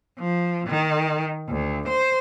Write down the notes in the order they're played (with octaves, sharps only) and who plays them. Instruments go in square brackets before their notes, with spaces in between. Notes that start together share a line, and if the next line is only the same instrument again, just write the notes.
[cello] F3
D#3
D2
C5